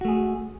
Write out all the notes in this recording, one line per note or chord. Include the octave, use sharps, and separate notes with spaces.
A3 F#4 G#4